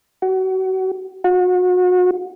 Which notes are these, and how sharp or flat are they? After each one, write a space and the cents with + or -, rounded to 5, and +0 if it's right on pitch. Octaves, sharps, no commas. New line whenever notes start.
F#4 +30
F#4 -35